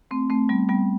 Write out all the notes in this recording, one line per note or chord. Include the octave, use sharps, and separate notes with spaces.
A3 C4
A3 C4
G3 B3
G3 B3